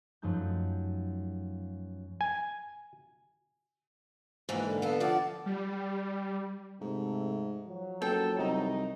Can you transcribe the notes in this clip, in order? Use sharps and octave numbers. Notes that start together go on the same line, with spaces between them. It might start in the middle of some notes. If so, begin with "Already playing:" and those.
F#2 F3 A3 D#4 G6
G#5
G#2 E3 F3 A#3
D3 A#4
B3 A4 F5
F3 D5 F#5
G3
G#2 C3 A3
F3 F#3
F#1 A4 G5
C2 D#4